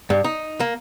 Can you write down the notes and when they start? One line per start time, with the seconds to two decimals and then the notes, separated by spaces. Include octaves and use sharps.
0.10 G2
0.24 D#4
0.60 A#3